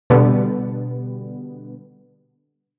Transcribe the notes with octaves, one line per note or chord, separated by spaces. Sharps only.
B2 D3 G3 B3